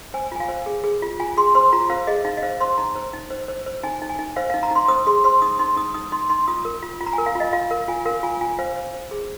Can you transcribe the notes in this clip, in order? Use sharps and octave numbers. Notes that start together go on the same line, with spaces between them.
C5 G#5
F4 G#5
F5
C5
G#4
G#4
F4
F4 G#5
G#4 C6
C5 C6
F4 A#5
C5 F5
G#4 D#5
D#4 F5
D#5
C5 F5
C5 C6
D#4 A#5
C5
D#4
C5
C5
C5
D#4 G#5
D#4
G#5
D#4
C5 F5
D#4 F5
A#5
D#4 C6
C5 D#6
G#4 C6
C5 C6
D#4 D#6
D#4 C6
D#4 D#6
D#4 D#6
D#4 C6
D#4 C6
F4 D#6
A#4
F4
F4
A#5
A#4 G#5
F5
F4 D#5
F4 F5
A#4 F5
F4 G#5
A#4 F5
F4 G#5
F4 G#5
C5 F5
C5
C5
G#4